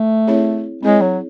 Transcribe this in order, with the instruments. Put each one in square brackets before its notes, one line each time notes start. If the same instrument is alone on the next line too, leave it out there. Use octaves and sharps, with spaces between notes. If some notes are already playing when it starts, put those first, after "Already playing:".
Already playing: [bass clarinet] A3
[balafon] C4 E4 G#4 C#5
[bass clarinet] G#3 [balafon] C4 E4 G#4 C#5
[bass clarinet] F#3